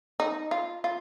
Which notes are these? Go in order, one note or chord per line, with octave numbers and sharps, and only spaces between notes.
D#4
F4
F4